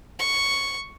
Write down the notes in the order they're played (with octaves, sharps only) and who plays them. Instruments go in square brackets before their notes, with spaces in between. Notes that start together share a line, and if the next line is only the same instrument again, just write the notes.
[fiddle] C#6